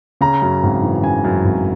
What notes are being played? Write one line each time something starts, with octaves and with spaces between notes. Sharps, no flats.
C#3 A#5
F#2
G#1
E3
C#3 G#5
F#2
G#1